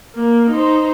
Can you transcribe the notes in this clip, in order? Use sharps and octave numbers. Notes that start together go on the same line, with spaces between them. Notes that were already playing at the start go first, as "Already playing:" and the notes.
A#3
D#4 C5